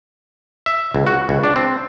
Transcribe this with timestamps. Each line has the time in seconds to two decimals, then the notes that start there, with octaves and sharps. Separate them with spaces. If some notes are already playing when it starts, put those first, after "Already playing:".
0.66 E5
0.94 C#2
1.07 F#4
1.29 C#2
1.43 D4
1.56 C4